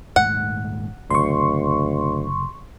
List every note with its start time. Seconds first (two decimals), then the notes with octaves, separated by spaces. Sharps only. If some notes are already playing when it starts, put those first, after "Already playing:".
0.16 D#1 G#2 A3 F#5
1.10 F#1 D2 C3 C6 C#6